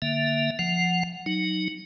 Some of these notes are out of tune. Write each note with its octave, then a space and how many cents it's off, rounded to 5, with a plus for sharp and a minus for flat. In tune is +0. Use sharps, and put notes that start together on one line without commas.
D3 +0 A#3 +0 E5 +0
F3 +0 F#5 +0
F#3 +0 D#4 +0